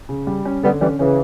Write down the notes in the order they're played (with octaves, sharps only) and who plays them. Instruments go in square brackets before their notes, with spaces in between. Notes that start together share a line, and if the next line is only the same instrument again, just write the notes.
[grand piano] C#3
G3
C#4
[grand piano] D3 [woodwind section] G3 B3
[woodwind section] E3 G3 [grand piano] C#4
[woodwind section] C#3 E3 [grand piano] C#4